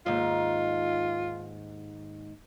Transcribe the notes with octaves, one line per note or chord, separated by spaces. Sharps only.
D#2 G#2 F4